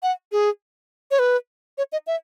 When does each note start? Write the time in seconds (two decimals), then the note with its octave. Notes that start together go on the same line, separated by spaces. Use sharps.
0.03 F#5
0.32 G#4
1.11 C#5
1.19 B4
1.78 C#5
1.92 D#5
2.07 E5